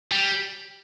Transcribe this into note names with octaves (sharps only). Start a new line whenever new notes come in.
G3